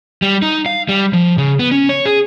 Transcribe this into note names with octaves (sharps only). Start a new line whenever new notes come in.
G3
D#4
F5
G3
F3
C#3
B3
C#4
C#5
G#4